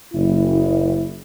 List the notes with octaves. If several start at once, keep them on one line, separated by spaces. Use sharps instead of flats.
F#1 E4